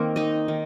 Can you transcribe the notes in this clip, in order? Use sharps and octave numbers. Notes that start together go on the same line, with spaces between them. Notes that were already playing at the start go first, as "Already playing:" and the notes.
Already playing: D#3 A#3 C4
D#4 D#5
D#3